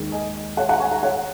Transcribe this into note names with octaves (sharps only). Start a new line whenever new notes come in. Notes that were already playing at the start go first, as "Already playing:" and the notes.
Already playing: D#2 D#3 G#3
D#5 G#5
C#5 F#5
F#5 A#5
G#5 C#6
F#5 A#5
C#5 F#5